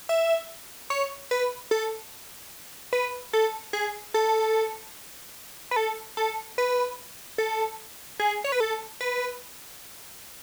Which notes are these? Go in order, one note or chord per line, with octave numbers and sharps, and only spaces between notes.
E5
C#5
B4
A4
B4
A4
G#4
A4
B4
A4
A4
B4
A4
G#4
C#5
B4
A4
B4